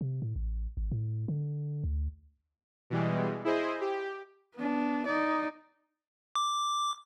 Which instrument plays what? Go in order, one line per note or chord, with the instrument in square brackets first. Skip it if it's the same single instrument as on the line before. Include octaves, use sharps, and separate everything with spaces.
[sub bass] C3
A2
A1
G#1
A2
D3
D2
[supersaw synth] B2 E3 G3 G#3
E4 G#4 C5 D#5
G4
[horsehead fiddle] B3 D4
D#4 D5
[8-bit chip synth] D6